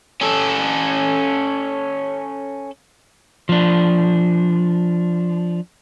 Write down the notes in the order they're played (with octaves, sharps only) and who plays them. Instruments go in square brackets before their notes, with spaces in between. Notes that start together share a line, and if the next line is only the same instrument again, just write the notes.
[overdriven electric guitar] C#4 A4
[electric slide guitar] F3 D4